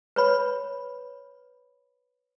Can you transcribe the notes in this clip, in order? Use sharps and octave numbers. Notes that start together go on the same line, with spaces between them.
B4 C#5 B5